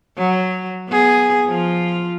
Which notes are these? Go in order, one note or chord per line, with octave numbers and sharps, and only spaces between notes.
F#3
B3 G#4
F3 F4